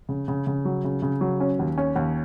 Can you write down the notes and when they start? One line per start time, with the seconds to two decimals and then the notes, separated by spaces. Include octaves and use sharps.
0.09 C#3
0.28 C#3
0.47 C#3
0.65 F#3
0.84 C#3
1.02 C#3
1.21 F#3
1.40 C#4
1.59 D#2
1.78 C#4
1.96 D#2